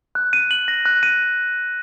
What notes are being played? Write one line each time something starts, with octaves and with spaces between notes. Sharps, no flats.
F#6
D#7
F#7
A#6
F#6
D#7